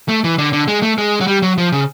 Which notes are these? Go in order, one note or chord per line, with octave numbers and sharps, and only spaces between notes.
A3
E3
D3
D3
G#3
A3
G#3
F#3
G3
F#3
F3
C#3